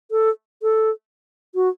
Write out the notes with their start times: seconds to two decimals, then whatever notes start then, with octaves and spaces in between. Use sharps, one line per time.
0.11 A4
0.63 A4
1.55 F#4